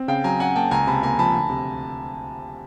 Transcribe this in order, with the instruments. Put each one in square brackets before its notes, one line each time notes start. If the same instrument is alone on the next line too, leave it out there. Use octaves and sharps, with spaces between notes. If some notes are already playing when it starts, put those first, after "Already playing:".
Already playing: [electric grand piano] C4
[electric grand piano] C#3 [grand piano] F5 G5
[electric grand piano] F#3 [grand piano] G#5 A#5
[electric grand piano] C#4 [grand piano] F#5 G#5
[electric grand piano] A#3 [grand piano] G5 A5
[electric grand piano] C#2 [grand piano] G#5 A#5
[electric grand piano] C3 [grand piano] A5 B5
[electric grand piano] A#3 [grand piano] G#5 A#5
[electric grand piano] F3 [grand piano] A5 B5
[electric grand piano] D2
C3